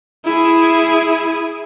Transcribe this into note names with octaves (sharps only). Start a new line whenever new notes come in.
E4 G#4